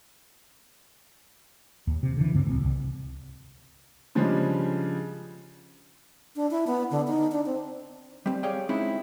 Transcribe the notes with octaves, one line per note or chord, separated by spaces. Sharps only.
D#2
C3
D3 E3
D2 G2 D3 C4
D1 C2 C4
C2
C#3 F3 G3 G#3 D4
D4
E4
B3
D3
D#4
D4
C4
G3 C4
G4 G#4 C#5 D5 F5 G5
G#3 C4 C#4 D#4 E4